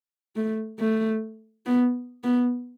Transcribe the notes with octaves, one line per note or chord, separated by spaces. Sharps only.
A3
A3
B3
B3